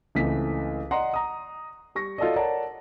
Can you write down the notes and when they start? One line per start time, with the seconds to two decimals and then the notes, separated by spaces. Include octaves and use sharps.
0.15 C#2 E3 A3 C4 B6
0.91 D5 D#5 F#5 A#5 C6
1.13 A#5 D#6
1.95 G3 C#6 A#6
2.18 F4 F#4 A4 D5 D#5
2.36 A#4 C#5 D5 F#5 A5 A#5